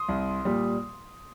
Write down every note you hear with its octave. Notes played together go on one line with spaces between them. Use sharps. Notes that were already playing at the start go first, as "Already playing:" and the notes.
Already playing: C6 D#6
C2
A#2 G3